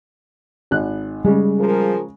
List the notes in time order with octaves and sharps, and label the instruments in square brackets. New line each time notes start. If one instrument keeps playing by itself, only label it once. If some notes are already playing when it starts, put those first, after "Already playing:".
[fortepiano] G#1 F#6
[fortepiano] C#3 G#3 [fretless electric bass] G3
[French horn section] F3 G#4 A#4